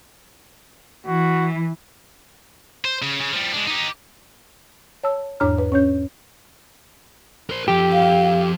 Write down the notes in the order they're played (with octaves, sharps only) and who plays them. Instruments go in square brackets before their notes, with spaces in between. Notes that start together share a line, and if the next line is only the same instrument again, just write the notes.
[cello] E3 [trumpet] F#4
[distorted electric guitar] C5
C#3
C#3
F3 G3
G#3 D4
D#4 G4
[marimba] C#5 A5 E6
E2 G#2 D4 C#5 A#5 F6
B4
C#4 C#5 G6
[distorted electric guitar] A#4 C5
[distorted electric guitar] F3 A4 [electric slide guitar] G4
[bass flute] F5